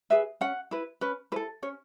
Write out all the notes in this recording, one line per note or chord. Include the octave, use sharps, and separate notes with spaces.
G#4 B4 E5
C#4 F#5
E4 B4
C#4 B4
E4 A4 B4
C#4 C#5